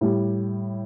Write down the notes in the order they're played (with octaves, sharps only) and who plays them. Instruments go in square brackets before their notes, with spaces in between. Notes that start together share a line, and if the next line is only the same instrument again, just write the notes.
[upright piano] A2 G3